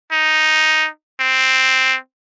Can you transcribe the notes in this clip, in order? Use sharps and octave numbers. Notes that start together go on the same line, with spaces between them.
D#4
C4